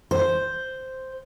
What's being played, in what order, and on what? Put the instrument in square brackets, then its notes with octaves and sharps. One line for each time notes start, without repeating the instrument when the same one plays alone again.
[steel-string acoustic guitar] C5